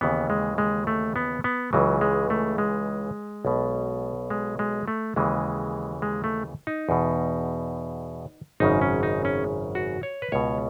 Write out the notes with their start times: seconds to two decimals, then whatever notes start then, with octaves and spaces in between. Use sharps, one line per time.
0.01 D#2 C#3 E3 B3
0.30 G#3
0.58 G#3
0.87 A3
1.16 B3
1.44 B3
1.73 C#2 C#3 E3 F#3
2.01 G#3
2.30 A3
2.58 G#3
3.45 B1 B2
4.30 G#3
4.59 G#3
4.88 A3
5.16 D#2 C#3 E3 G#3
6.02 G#3
6.24 A3
6.67 D#4
6.89 E2 B2
8.60 G#1 F#2 C#3 D#4
8.81 C#4
9.03 D#4
9.25 C#4
9.75 F#4
10.03 C#5
10.22 B4
10.32 C#2 B2 C#5